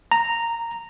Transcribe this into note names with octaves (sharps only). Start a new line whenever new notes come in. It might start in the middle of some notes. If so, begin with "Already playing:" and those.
A#5